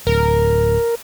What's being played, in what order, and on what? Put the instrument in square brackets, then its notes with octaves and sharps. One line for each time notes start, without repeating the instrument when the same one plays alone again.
[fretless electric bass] D1 [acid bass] A#4